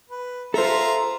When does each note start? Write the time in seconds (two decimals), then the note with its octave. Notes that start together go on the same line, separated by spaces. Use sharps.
0.10 B4
0.54 F4 A4 C5 E5 A#5